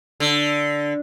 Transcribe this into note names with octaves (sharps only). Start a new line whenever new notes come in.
D3